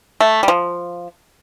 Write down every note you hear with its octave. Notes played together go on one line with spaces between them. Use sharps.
A3
G3
F3